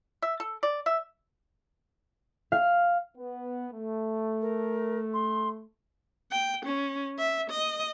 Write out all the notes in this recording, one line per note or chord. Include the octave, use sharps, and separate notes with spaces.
E5
A4
D5
E5
F5
B3
A3
A#4
C6
G5
C#4
E5
D#5